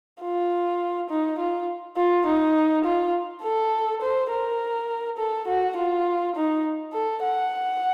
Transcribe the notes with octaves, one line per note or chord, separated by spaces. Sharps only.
F4
D#4
F4
F4
D#4
F4
A4
C5
A#4
A4
F#4
F4
D#4
A4
F#5